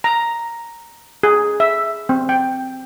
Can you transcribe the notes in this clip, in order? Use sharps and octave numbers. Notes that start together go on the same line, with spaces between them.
A#5
G#4
E5
C4
G5